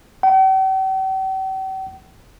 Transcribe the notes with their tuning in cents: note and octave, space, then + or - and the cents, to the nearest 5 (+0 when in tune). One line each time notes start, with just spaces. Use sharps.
G5 -45